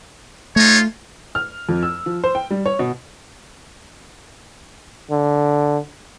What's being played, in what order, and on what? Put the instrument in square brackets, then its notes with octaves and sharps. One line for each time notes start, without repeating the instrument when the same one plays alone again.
[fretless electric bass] A3 [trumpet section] D#4 F4 C#5
[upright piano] F6
F2
E6
F3
C5
G5
G3
C#5
B2
[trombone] D3